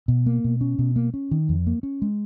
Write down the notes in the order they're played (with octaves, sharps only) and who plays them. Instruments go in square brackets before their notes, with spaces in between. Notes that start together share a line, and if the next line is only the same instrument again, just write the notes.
[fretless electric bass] B2
A#3
B2
C#4
B2
A#3
C#4
D#3
F2
A#3
C#4
G#3